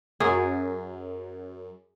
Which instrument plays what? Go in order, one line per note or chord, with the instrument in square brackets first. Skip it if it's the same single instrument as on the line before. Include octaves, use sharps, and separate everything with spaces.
[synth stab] F#2 [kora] G#4